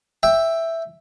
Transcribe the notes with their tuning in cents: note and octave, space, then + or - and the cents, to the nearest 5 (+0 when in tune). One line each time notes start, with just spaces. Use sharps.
E5 +0 G5 +10